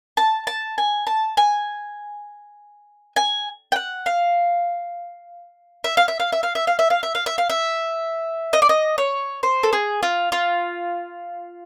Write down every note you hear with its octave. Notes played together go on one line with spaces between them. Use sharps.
A5
A5
G#5
A5
G#5
G#5
G5
F#5
F5
E5
F5
E5
F5
E5
F5
E5
F5
E5
F5
E5
F5
E5
F5
E5
D#5
D5
D#5
C#5
C5
A4
G#4
F4
F4